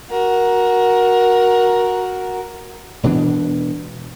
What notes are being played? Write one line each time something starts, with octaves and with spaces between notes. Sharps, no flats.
F#4 A#4
E1 B2 E3 D4